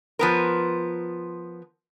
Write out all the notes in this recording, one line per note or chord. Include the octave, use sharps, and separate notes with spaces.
F3 B3 A#4